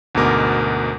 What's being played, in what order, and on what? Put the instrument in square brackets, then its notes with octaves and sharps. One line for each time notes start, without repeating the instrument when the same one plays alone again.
[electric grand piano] D2 G#2 B2 A#4 D6